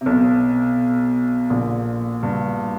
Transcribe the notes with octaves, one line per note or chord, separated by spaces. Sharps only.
C3
B1 B2
A#1 A#2
G2